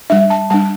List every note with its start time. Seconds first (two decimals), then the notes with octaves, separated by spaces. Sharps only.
0.10 G3 D4 E5
0.30 A5
0.50 G3 D4 A5